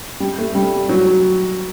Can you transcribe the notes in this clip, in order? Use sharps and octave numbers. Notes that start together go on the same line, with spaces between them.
G3
A3
G3
F#3